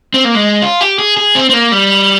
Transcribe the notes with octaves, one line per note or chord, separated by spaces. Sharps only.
C4
A#3
G#3
F4
G4
G#4
G#4
C4
C4
A#3
G3